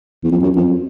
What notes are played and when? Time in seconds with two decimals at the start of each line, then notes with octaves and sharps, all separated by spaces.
0.24 E2
0.31 F2
0.43 F#2
0.56 F2